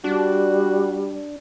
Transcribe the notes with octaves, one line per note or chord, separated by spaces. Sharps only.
G3 D4 F#4